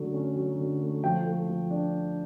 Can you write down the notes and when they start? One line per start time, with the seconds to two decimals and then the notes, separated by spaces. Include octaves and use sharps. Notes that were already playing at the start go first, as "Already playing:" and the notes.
Already playing: D3 F#3 A3 C#4
0.14 C#4
0.36 F#3
0.59 D3
0.80 A3
1.04 F3 G5
1.25 A3
1.48 F3
1.70 D4